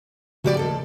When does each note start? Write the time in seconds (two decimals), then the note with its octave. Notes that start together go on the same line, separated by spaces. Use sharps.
0.44 C#3 F3 A3 F#4 G4 D5
0.57 D#2 A4